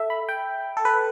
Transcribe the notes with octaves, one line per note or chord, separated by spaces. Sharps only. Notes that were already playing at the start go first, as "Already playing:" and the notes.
Already playing: A4 E5
B5
G5
A4
B4